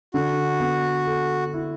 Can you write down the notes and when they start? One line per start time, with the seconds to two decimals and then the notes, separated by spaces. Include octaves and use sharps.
0.14 D3 F#4
0.60 B3
1.07 A4
1.54 E4